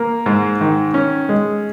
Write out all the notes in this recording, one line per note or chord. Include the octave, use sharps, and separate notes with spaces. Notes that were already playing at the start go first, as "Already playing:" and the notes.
Already playing: A#3
G#2
D#3
C#4
G#3